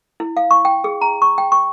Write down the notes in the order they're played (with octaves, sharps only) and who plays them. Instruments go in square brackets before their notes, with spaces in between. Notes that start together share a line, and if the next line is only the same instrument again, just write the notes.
[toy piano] E4
F5
C#6
G5
G#4
A#5
C#6
G5
C#6